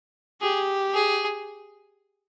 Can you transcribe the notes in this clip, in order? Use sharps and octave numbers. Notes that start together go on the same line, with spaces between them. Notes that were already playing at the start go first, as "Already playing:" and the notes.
G4 G#4
G#4